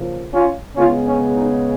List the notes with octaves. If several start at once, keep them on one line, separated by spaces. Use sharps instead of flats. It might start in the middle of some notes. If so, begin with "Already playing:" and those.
Already playing: C#3 F3 A#3
C#4 F4
C#3 G#3 B3 C#4 F4
C#4
D#4